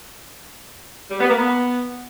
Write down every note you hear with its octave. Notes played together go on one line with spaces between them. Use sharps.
G3
B3
A#3
B3